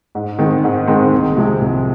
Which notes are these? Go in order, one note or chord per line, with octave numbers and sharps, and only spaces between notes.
G#2
D#3 G#3 C4
G#2
D#3 G#3 C4
C2
C3 F3 G#3
C2